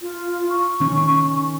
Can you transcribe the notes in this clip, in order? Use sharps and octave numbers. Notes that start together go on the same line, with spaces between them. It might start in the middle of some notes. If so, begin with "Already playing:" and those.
F4
C#6
D#3 C#4